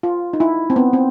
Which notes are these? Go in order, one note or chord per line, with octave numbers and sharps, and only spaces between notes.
F4
D#4
E4
C4
B3
C4